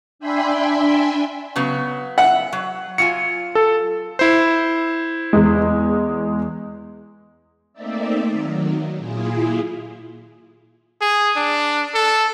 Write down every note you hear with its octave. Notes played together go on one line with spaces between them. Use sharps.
D4 E5 G5 G#5 B5 C6
C#3 F#3 B3
E5 F#5
F#3
F#3 F4 G#5 C#7
A4
E4 C5
E2 G#3
A3 A#3 C4 D#4 D5 E5
D#3 F#3
A#2 E4 F4 G#4
G#4
D4
A4